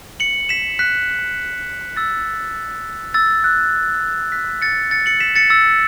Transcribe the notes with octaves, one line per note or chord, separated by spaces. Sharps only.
C#7 F#7
B6 E7
F#6 B6
E6 A6
E6 A6
F#6
F#6 B6
A6 C#7
A6 C#7
C#7 F#7
B6 E7
A6 C#7
E6 A6